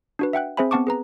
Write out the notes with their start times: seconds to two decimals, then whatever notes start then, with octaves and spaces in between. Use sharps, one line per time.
0.19 D4 F#4 B4
0.33 E5 F#5 G5 F#6
0.57 C4 G#4 C5 E5 G#5 B5
0.71 B3 C4 F#5 A5 C#6 D6
0.87 G#4 B4 A#5